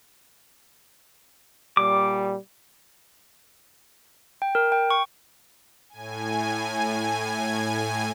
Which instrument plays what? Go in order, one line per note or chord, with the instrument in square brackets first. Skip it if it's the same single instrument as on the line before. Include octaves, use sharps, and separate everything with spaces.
[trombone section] A#2 G3 [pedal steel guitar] D6
[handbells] G5
A#4
G5
C#6
[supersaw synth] A2 G#5